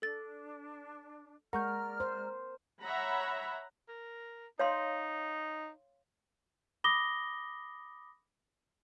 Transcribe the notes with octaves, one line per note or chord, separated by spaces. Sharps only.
D4 A4 A6
G#3 A#4 D5 F#5 A#5 C#6 F6 G6
C5
C#5 E5 F#5 A#5 B5
A#4
D#4 C#5 F5 C6
B5 D6 D#6 A#6 G7